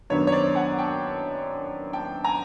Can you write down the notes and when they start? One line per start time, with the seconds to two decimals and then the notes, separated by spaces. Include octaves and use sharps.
0.10 F#2 D#3 F#3 B3 D4 C#5
0.27 C#5
0.32 C5 D5
0.55 F#5 G#5
0.79 G5 A5
1.93 G5 A5
2.24 G#5 A#5